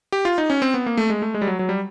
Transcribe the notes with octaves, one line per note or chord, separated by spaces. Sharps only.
G4
F4
D#4
C#4
C4
B3
A#3
A3
G#3
A3
G#3
G3
F#3
F#3
G3